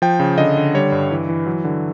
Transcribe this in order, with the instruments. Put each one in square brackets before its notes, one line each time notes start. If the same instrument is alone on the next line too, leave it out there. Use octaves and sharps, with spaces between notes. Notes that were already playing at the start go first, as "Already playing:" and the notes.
[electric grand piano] F3 G5
C#3
D3 D#5
D3
G3 C#5
G2
E3
E3
F#3
D3